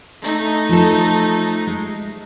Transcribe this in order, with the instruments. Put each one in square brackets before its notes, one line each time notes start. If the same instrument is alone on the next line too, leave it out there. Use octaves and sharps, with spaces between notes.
[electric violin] A3 D#4
[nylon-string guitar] F3 A4
G#3